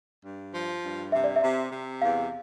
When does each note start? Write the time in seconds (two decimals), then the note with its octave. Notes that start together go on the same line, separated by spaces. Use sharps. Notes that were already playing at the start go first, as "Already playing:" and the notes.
0.23 G2
0.53 F3
0.82 G2
1.12 C3 E5
1.24 D5
1.36 E5
1.41 C3
1.71 C3
2.01 E2 F5